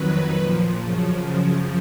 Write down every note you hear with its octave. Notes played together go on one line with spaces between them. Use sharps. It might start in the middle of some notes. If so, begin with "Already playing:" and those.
Already playing: F2 D#3 F#3 B4
A#2 F3
F#2 C#3 F3